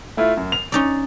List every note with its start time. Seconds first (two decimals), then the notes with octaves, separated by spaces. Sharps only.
0.17 A3 E4 F4
0.37 F#2
0.52 F7
0.72 C#4 D#4 D5